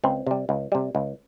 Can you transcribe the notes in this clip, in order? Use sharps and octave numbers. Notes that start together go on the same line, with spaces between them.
C#2 C4
C3 G3
C#2
C3 G3
C#2